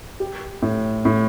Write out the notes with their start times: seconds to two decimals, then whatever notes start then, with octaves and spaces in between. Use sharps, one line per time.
0.20 G4
0.62 A2
1.05 A2